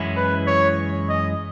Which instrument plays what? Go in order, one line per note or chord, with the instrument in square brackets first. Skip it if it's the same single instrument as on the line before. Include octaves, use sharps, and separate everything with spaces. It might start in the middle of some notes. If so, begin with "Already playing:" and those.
Already playing: [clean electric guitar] F#2 E3 G#3 C#4 E4
[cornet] B4
C#5
D#5